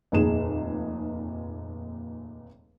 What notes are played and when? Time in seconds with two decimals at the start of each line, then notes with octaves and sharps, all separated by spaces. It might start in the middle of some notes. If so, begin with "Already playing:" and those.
0.12 F1 D#2 A#2 G#4 E7